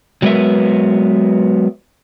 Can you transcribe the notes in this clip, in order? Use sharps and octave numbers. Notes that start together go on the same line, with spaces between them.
F#3 G#3 B3 A#4 B4 E5